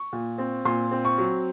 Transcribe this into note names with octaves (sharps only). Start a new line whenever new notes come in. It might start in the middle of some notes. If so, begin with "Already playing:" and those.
Already playing: C#6
A#2
C4
A#2 C6
C4
C#6
F#3